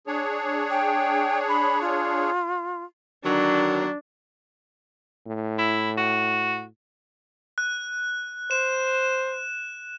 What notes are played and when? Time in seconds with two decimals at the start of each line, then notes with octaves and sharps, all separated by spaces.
0.07 D4 G#4 C#5
0.70 G5
1.49 B5
1.81 F4
3.25 D3 D#3 F#3 D4
5.27 A2
5.58 E4
5.97 F#4
7.58 F#6
8.51 C5 E7